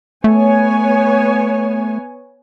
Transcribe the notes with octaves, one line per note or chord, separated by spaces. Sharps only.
A3 B3 C#5 G#5